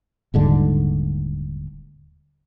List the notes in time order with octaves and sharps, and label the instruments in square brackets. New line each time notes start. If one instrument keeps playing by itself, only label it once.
[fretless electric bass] D#1 G#2 D3